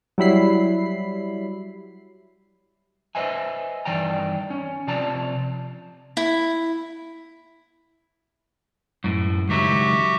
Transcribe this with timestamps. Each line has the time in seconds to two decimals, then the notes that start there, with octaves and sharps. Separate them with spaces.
0.18 F#3 G3 E4 B5 C7
3.15 B4 C5 D#5 E5 G#5
3.85 G2 D#3 E3 D5 G5 A#5
4.50 C#4
4.87 C3 F3 D5 A5 A#5
6.17 E4
9.04 F#2 A2
9.49 C#2 D#3 F#3 F#4 G4 E5